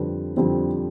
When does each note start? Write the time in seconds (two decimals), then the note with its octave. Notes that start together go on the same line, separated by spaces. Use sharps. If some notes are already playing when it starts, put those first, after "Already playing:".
Already playing: F2 D3 G3 C4 B4
0.37 F2 D3 G3 C4